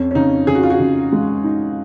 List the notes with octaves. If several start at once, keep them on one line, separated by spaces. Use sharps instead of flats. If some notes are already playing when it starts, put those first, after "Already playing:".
Already playing: F2 C#4
C#4
C#3 D#4
C#3 G#4
F#4
F4
F#4
C#3
G#3
D#4